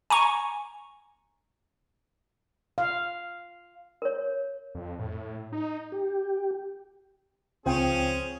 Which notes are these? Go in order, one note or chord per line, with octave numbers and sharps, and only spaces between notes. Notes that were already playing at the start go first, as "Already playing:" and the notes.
G#5 A#5 C#6
F5
A#4 C#5
F2
A2
D#4
G4
C#2 F3 C4 C#4 G#4 G5